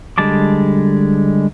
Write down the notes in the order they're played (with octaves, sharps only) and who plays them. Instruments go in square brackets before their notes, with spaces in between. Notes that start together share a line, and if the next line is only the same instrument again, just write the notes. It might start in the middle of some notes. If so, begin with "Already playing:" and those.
[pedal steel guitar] D3 G3 G#3 A5 D6